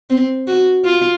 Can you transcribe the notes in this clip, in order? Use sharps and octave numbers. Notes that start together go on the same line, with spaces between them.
C4
F#4
F4